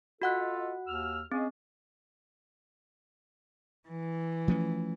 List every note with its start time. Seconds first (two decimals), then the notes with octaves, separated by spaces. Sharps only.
0.22 F4 F#4 A4 D#5 F#5 F#6
0.87 D#2 E6 F6
1.32 C4 C#4 G#4 D#5
3.88 E3
4.48 F3 A3 C#4